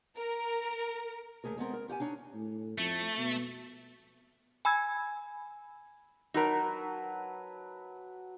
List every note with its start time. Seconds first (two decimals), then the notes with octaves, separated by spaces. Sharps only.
0.18 A#4
1.44 D#2 A3 G#4 A#4
1.57 G#3 B3 C4 A#4
1.73 A#4
1.88 B3 G4 F#5 G#5
2.00 D4 D#4 C#5
2.34 A2
2.78 F2 A3
3.18 B2
4.65 G#5 B5 E6 G#6
6.34 F#3 D#4 A#4 B4 A5